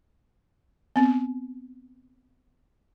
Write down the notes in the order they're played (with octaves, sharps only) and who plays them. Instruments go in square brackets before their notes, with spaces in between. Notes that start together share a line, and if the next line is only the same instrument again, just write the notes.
[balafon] B3 C4